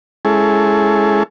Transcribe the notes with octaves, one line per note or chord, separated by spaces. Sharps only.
G#3 C#4 E4 G#4 A4